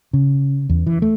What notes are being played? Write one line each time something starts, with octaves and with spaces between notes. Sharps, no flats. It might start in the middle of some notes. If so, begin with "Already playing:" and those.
C#3
E2
E3
A3